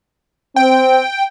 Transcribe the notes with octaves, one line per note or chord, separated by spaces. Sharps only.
C4 G5